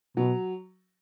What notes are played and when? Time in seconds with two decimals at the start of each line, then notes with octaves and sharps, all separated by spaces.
0.17 B2 F#3